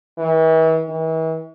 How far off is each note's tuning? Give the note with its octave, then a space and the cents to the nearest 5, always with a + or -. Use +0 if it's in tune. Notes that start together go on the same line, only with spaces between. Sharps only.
E3 -40
E3 -40